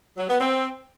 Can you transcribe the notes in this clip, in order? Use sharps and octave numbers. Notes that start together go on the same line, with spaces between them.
F#3
B3
C4